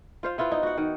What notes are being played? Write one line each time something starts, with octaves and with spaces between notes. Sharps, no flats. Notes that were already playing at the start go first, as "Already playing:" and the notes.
F4 C5 F5
B3 E4 F4 B4
D#4
F#4 F#5
D#3